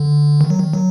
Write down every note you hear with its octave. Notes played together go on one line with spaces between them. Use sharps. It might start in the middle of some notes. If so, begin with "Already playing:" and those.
Already playing: D3
D#3
F#3
D#3
F#3